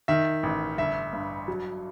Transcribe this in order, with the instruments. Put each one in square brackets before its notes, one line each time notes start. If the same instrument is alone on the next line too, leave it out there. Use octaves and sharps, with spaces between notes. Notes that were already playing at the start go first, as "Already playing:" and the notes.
[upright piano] D#3 E5
A1
G1 E5
G2
F#3